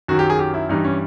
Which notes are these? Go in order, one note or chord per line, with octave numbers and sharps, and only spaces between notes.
F#2 D#3 F#3 F#4
G4
G#4
G4
E4
G2 E3 G3 D#4
C#4